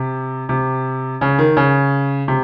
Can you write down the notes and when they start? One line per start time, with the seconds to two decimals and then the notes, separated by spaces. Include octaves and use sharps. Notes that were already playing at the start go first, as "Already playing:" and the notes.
Already playing: C3
0.49 C3
1.21 C#3
1.39 D#3
1.57 C#3
2.28 C3